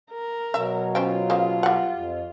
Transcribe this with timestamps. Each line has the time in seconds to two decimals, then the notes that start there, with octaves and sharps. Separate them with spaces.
0.11 A#4
0.54 B2 F#3 E5
0.95 C#4 F4 C5 G5
1.30 C#3 A#3 C5
1.63 G3 F#5
1.94 F2